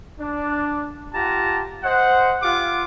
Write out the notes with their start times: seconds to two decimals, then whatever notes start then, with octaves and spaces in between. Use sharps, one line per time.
0.20 D4
1.14 F4 G4 F#5 A5 A#5
1.84 C5 D#5 F#5
2.43 F4 G4 F5 F#5 D6